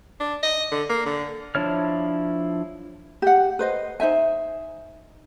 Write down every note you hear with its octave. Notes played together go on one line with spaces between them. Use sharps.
D4
D#5
D3
A#3
D3
F3 D4 E4 C#5 F6
G4 F#5
B4 C5 D#5
D#4 C5 E5 G#5